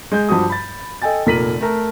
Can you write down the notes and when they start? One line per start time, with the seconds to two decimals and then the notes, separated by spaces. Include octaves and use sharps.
0.12 G#3 G6
0.29 G2 F3 F#4 D#6
0.50 B5 A6
1.02 A4 D#5 G5 G#5 A6
1.26 F1 A#2 A#4 B6 D#7 F#7
1.61 A3 A#4 A5